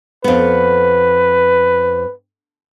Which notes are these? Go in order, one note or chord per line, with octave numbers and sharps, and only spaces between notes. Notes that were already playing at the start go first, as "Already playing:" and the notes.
F2 B3 B4